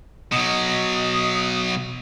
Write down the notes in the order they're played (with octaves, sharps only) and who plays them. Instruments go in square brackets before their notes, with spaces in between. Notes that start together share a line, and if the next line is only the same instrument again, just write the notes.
[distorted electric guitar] B2 F#3 [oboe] D#5